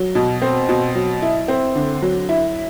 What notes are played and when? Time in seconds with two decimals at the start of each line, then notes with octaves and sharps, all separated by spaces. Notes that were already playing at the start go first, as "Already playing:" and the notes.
Already playing: F#3
0.15 B2
0.42 C4
0.69 B2
0.95 F#3
1.22 E4
1.48 C4
1.75 D3
2.02 F#3
2.29 E4